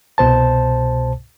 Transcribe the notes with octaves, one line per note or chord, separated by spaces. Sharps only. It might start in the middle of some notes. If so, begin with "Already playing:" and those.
C2 B2 C5 A5